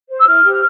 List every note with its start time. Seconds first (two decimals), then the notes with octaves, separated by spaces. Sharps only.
0.10 C5
0.19 E6
0.26 E4 F6
0.43 G4 C5